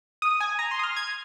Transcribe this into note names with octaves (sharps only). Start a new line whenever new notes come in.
D#6
G#5
A#5
C6
D#6
F6
G#6